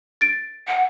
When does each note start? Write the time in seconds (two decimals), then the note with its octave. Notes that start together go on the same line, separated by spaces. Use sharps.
0.21 A6 D7
0.67 F#5